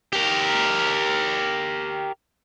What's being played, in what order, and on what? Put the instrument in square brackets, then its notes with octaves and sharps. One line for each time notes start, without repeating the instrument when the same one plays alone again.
[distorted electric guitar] G4 A#4